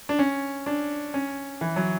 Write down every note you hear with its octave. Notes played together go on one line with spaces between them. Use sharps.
D4
C#4
D4
C#4
E3
F#3